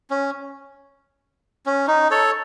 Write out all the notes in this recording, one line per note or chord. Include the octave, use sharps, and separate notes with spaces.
C#4
C#4
D#4
A4 C#5